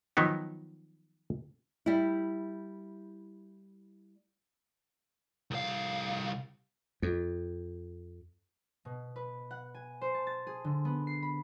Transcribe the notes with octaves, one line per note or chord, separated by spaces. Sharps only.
D#3 F3 F#3 B3 D#4
G3 E4
C2 F5
F2
B2
B4
F#5
G#5
C5
A5
A6
G#4
D3
B3
C7
B5